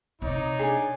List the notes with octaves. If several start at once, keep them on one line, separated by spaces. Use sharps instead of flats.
C3 D#4 C#5 D5
D4 G#4